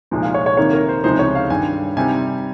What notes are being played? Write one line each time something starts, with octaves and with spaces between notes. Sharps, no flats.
C2 A#2 F3 G#3 D#4
F5
C#5
C#5
C3 D#3 A#3 D#4 C#5
A#4
C5
C#2 C3 F3 G#3 D#4 C5
C#5
F5
G2 D#3 G3 G#5
C3 G3 C4 D#4 G#5